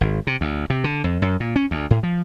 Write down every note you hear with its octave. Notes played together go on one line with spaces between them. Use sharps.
G#1
C3
D2
C3
D3
F2
F#2
A#2
C#4
D2
A2
F3